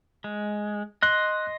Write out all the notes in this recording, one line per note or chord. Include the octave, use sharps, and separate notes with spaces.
G#3
D#5 C6 F#6